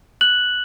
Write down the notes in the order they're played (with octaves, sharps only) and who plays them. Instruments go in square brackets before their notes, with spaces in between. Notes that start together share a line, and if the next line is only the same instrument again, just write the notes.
[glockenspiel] F#6 F#7